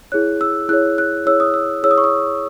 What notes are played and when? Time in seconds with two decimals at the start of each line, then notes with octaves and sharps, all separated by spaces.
0.12 E4 G#4 C#5 F#6
0.41 E6
0.69 E4 G#4 C#5 F#6
0.98 F#6
1.26 E4 G#4 C#5 E6
1.40 D#6
1.54 E6
1.83 E4 G#4 C#5 E6
1.91 D#6
1.98 C#6
2.04 D#6